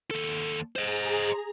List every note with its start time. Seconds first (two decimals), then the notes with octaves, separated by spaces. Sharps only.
0.11 D#2 A4
0.76 G#4 C5 D#5 A#5